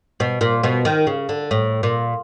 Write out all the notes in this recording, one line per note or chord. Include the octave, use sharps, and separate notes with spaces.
B2
A#2
B2
D#3
C#3
D3
A2
A#2